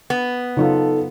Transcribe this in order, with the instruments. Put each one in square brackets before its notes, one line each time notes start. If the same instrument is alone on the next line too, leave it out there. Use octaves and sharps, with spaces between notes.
[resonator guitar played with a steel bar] B3
[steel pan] C#3 F#3 F4 [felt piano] D#4 [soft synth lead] A4